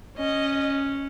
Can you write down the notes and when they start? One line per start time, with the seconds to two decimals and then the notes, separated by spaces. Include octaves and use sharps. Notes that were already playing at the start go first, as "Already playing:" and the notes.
0.18 C#4 D#5